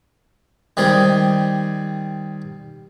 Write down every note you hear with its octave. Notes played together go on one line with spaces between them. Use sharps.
D#3 G3 C4 G#4